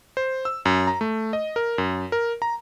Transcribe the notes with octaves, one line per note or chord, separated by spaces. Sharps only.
C5
E6
F#2
A#5
A3
D#5
A#4
F#2
A#4
A#5